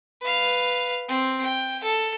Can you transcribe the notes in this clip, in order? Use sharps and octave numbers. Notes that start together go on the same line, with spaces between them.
B4 F5
C4
G5
A4